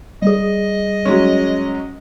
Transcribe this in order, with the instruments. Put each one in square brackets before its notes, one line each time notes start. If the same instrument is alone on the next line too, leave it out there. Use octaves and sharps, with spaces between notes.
[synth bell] G3 G#4 [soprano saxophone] D#5
[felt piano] F#3 G#3 C#4